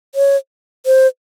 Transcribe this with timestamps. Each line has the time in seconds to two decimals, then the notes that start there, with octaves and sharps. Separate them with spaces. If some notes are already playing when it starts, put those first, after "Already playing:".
0.15 C#5
0.86 C5